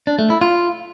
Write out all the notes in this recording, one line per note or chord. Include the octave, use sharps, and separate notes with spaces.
D4
A3
E4
F4